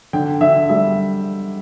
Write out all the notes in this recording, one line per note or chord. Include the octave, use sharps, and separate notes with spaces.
D3 G5
D3 E5
G3 E5